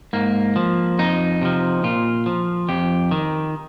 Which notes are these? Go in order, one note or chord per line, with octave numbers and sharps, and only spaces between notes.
G#2 A#3
F3
F2 D#4
C3 F3
A#2 F4
F3
F2 G4
D#3